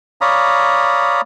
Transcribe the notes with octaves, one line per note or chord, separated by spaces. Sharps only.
C#5 D5 F5 A#5 B5 D#6